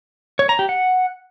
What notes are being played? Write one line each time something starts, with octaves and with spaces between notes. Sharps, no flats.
C#5
A#5
G4
F#5